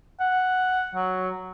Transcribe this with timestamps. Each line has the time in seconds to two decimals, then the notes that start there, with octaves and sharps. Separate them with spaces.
0.20 F#5
0.95 F#3